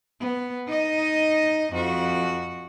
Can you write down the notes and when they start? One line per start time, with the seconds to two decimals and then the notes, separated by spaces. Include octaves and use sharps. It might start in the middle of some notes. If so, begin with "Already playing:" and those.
0.20 B3
0.67 D#4 D#5
1.73 F2 F#4